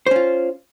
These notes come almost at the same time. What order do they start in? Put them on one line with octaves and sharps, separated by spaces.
C5 C#4 F4